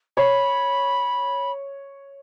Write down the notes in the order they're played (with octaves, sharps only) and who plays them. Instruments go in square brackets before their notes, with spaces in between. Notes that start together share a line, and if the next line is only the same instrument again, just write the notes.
[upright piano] C#5 [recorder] B5